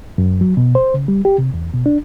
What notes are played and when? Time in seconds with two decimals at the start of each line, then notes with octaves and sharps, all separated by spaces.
0.18 F#2
0.41 F#3
0.57 B2
0.75 C5
0.94 C#3
1.08 G3
1.25 G4
1.38 C3
1.54 E2
1.73 B2
1.86 D4